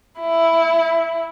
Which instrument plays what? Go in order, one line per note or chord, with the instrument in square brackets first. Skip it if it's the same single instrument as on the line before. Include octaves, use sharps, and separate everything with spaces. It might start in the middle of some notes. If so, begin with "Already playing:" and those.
[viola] E4